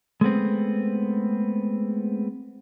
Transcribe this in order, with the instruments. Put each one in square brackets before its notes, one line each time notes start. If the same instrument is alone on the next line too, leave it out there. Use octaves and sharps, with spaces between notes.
[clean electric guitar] G#3 A3 B3 C4